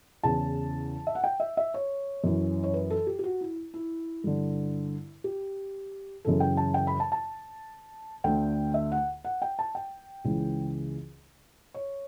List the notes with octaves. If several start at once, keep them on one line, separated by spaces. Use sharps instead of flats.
E2 C#3 E3 A5
E5
F#5
G5
E5
E5
C#5
F#2 E3
C#5
B4
A4
G4
G4
F#4
E4
E4
G2 D3
G4
F#2 C#3 E3 A4
G5
A5
G5
B5
A5
A5
D2 D3 G5
E5
F#5
F#5
G5
A5
G5
C#2 C#3 E3
C#5